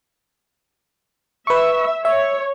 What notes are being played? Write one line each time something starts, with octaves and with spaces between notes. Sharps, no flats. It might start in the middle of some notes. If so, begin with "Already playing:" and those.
B4 E5 C#6
C#5 E5